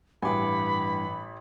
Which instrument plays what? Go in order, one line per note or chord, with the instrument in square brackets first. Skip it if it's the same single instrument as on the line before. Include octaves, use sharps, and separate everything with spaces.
[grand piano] A1 G#5 [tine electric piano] G2 E3 [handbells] F#5 D6 [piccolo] B5